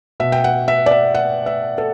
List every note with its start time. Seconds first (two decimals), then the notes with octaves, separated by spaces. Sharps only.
0.20 B2 E5
0.32 G5
0.44 F#5
0.68 E5
0.86 D5
0.91 E5
1.15 F#5
1.46 E5
1.78 A4